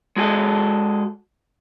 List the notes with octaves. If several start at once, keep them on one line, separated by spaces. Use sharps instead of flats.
G#3 F#4 G#4 A4